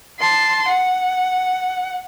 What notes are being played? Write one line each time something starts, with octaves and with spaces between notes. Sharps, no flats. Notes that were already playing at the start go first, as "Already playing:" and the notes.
A5 C6
F#5